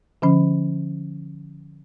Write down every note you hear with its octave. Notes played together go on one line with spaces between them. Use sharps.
D3 F3 C#4